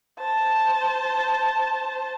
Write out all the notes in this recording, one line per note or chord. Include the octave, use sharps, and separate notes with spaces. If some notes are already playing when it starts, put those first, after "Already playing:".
C5 A5